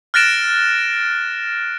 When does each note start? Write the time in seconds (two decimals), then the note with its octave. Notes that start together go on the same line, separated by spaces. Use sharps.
0.14 F6 F#6 A6 A#6 D7 E7